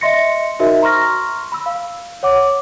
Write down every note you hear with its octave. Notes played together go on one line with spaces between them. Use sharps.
D#5 E5 C6 A#6 C#7
D#4 F#4 A#4 C5 D#5 E5
A#5 C6 C#6 F6 A#6
B5 E6
F5
C#5 F#5 D6